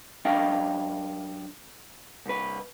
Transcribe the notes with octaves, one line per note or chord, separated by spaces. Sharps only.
F#2 D4 D#5 F5 G5
C2 B4